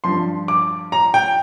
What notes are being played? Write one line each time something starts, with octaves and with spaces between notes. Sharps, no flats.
G2 F3 C6
D6
A#5
G5